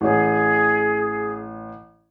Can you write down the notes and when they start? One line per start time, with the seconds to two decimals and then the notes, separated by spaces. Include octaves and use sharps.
0.01 A1 G#4 C#5